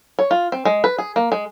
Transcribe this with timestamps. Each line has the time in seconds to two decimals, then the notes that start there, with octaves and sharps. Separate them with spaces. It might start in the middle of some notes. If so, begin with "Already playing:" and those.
0.19 C#5
0.31 F4
0.52 C4
0.65 G#3
0.84 B4
0.98 G#4
1.16 A#3
1.32 G#3